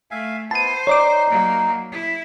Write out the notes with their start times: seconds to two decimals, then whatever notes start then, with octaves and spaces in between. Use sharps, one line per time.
0.11 A3 E5 F5 G#5
0.51 B3 E4 C5 A5 D#7
0.87 D#4 C#5 D5 D6
1.29 F#3 A#3
1.92 E4